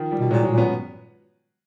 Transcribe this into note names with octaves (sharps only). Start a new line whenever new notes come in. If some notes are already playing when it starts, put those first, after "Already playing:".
Already playing: D#3 F3
F3 G3
B2
A#2 F#3 G#3
F#3 G#3
A#2
B3 C#4